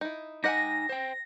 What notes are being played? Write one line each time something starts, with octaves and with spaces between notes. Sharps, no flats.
D#4 E4
D#4 G4 D#5 F#5 G#5 A#6
C5 G5